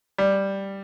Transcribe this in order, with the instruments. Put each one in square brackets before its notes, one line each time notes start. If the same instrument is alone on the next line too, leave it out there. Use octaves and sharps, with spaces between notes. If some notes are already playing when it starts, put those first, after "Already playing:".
[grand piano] G3